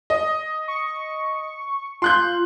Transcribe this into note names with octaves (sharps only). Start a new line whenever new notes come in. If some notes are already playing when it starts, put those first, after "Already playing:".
D#5
C#6
F4 C6 F#6 G6